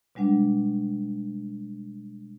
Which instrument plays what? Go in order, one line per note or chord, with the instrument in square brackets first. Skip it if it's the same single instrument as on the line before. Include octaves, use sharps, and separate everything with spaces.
[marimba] B2 G3 G#3 D4 F#5